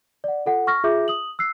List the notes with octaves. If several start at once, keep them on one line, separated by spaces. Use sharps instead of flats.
D5 F#5
F4 A4 F#5
C#6 F6 A#6
F4 G#4 E5 D6 G6 A#6
D#6 F#7
E6 F#6 C7